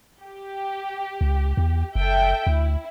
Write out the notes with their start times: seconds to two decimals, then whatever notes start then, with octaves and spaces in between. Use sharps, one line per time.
0.22 G4
1.21 C#2
1.57 E2
1.95 F#1 A4 E5 G5
2.47 D2 E4